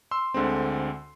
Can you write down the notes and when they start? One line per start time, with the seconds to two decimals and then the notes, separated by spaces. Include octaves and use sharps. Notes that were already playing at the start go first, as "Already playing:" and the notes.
0.11 C6 E6
0.34 D2 D3 G#3 C4